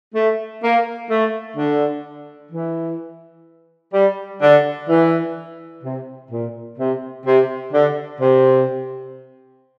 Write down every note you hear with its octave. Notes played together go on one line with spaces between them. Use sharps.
A3
A#3
A3
D3
E3
G3
D3
E3
C3
A#2
C3
C3
D3
C3